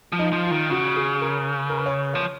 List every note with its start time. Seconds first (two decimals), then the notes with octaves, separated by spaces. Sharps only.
0.12 F3
0.19 D#4
0.33 F3
0.45 F4
0.51 D#3
0.70 C#3 F#4
0.96 G#4
1.21 A#4
1.69 A#4
1.77 B4
1.86 C#5
2.14 F3 C#5